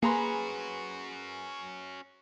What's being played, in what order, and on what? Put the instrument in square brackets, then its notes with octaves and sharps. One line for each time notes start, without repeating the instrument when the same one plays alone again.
[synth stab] A#3 [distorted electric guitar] C#4 F#4 [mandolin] G#4 B4 [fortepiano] G#5 A#5 C6